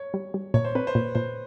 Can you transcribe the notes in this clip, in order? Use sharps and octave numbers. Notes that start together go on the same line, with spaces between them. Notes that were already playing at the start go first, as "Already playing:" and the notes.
Already playing: C#5
G3
G3
A#2 C#5
C5
C4 B4
C5
A#2
A#2 C5